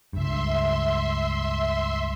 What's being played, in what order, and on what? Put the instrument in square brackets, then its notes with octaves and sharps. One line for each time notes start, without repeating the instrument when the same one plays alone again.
[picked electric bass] C#2 G2 [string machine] E5 C6